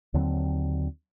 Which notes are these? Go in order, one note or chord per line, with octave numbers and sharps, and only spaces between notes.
D#2 D3 F#3 C4